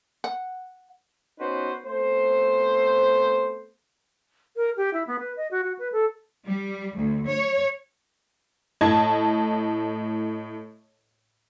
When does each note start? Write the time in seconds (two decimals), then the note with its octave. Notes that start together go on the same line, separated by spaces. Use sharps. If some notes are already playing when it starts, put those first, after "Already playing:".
0.24 F#5
1.39 B3 C#4 D#4 F#4 B4 C5
1.86 A3 B3 C4 C5
4.56 A#4
4.77 G4
4.93 E4
5.07 B3
5.19 B4
5.37 D#5
5.51 F#4
5.64 F#4
5.79 B4
5.92 A4
6.46 G3
6.96 D2
7.28 C#5
8.81 A2 D#5 A5 G#6